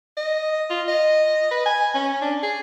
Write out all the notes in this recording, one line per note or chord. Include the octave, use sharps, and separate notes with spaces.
D#5
F4
D#5
B4
G#5
C#4
D4
G#4